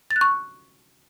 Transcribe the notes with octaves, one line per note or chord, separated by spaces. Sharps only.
A6
F#6
C#6